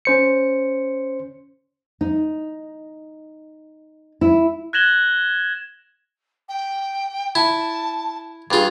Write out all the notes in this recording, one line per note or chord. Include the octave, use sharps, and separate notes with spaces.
C#4 C5 C#7
D#4
E4
F#6 G#6 A#6 E7 F#7 G7
G5
E4 A5
G2 F4 G#4